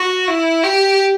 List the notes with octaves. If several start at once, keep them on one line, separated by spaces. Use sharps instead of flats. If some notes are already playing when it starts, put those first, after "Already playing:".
Already playing: F#4
E4
G4